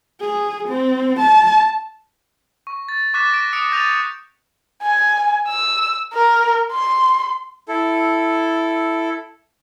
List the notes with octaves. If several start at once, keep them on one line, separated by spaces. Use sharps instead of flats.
G#4
C4
A5
C#6
A6
C#6 D6 F#6 A6 B6 E7
A#6 D7
D#6 C#7 D7
D#6 G6 A6 A#6 D#7 F7
G#5
E6
A#4
C6
E4 A4